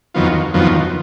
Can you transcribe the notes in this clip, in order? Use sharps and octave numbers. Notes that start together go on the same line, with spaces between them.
F2 D#3 F#3 B3 F4
F2 D#3 F#3 B3 F4